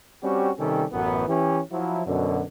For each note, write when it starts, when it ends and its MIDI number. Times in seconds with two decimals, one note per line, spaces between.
0.23 0.50 55
0.23 0.50 60
0.23 0.50 61
0.23 0.50 66
0.23 0.50 67
0.59 0.85 48
0.59 0.85 51
0.59 0.85 55
0.59 0.85 61
0.59 0.85 67
0.59 0.85 69
0.92 1.24 33
0.92 1.24 42
0.92 1.24 59
1.28 1.60 52
1.28 1.60 61
1.28 1.60 67
1.72 2.02 53
1.72 2.02 54
1.72 2.02 64
2.07 2.43 42
2.07 2.43 47
2.07 2.43 50